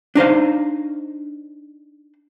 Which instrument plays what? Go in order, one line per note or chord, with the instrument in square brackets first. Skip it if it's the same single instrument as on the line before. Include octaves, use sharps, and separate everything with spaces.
[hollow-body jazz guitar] D4 D#4 C5 F5